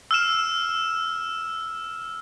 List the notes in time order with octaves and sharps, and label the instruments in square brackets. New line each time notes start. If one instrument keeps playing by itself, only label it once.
[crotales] E6 F6 E7